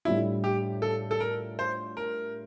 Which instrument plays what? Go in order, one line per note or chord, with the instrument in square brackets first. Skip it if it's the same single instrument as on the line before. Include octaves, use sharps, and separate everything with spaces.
[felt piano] A2 G3 D4 F4 [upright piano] E4
[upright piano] G4
A4
A4
A#4
C5
A#4